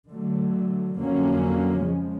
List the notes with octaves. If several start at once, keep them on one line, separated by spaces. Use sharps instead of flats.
D3 F#3 A3
F2 D3 F#3 A#3 C#4
C#3 F3 G#3